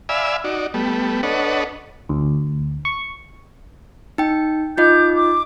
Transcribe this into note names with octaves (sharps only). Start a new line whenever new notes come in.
D5 E5 F5 G#5 B5 E6
D#4 F#4 D5
G3 A3 B3
D4 A4 B4 C#5 D#5 F#5
D2
C#6
D#4 G5
D#4 F4 D#5 D6 G6
D6